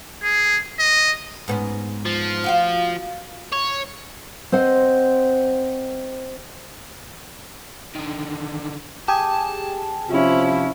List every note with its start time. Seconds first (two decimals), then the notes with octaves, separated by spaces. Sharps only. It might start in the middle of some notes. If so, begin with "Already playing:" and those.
0.23 G#4
0.80 D#5
1.48 G#2 B3 C#4
2.06 F3
2.44 F4 F#4 F5
3.52 C#5
4.52 C4 C5 D#5 F#5
7.95 D3 D#3
9.08 G4 G#4 G#5 A5
10.10 C3 F3 C#4 E4 F4